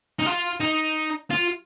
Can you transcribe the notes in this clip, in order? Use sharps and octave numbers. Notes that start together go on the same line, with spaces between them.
D#4
F4
D#4
F4